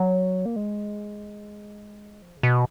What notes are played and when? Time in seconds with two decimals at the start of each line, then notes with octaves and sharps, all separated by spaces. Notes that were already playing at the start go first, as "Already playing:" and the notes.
Already playing: F#3
0.46 A#3
0.56 G#3
2.22 F3
2.37 C#3
2.43 B2